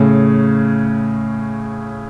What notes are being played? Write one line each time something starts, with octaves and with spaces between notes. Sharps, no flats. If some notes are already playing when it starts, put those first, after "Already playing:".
Already playing: A2 C#3